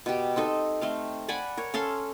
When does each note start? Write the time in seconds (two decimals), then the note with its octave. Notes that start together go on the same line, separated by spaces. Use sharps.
0.06 B2 G4
0.36 C4 D#4 A4 D#5
0.81 A3 C4 F5
1.28 D5 F#5 G#5 B5
1.57 A#4 C#5
1.74 C#4 A4 F5 C6